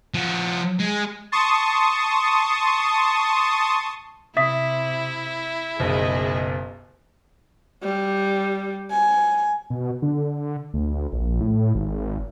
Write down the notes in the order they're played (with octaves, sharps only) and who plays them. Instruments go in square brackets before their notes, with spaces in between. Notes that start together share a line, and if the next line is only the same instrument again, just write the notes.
[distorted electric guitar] F3 F#4
G#3
[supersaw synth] A5 C6 C#6 D#6
[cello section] C3 [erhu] E4 [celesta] E5 D#6 B6
[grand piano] F#1 B1 [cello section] G4 G#4 D#5
[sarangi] G3
G#5
[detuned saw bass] B2
D3
D2
A#1
A2
G#1